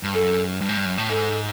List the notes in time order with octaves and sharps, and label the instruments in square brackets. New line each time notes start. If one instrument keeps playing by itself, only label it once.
[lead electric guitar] G2
[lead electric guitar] F#2 [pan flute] A4
[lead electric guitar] G2
G#2
G2
F#2
A2
[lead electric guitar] G#2 [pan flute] A4